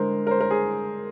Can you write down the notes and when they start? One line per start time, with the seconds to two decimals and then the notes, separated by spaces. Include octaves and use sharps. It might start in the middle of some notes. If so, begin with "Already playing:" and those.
Already playing: D3 G#3 A#4 C5
0.27 A#4
0.31 C5
0.41 A#4
0.51 G#4